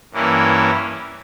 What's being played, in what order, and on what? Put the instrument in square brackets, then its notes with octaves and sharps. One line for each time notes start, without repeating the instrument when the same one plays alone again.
[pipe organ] G2 E3 A#3 C#4 E4